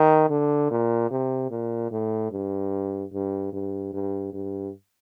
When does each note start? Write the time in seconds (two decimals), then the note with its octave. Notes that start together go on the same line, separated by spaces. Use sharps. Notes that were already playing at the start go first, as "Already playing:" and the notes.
Already playing: D#3
0.30 D3
0.70 A#2
1.10 C3
1.51 A#2
1.91 A2
2.31 G2
3.12 G2
3.52 G2
3.93 G2
4.33 G2